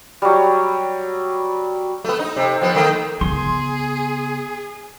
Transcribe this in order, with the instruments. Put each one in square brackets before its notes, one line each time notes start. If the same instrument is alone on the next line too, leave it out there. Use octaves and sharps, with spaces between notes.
[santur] F#3 G3
[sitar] A3 B3
D#4
C3
F3 B3
D#3 A3 A#3
[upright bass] C#3 B3 [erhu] G#4 [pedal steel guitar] C6